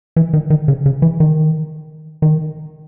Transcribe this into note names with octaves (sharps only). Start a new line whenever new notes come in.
E3
D#3
D#3
C#3
C#3
E3
D#3
D#3